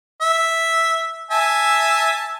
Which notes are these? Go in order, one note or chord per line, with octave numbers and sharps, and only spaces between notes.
E5
E5 G#5 A5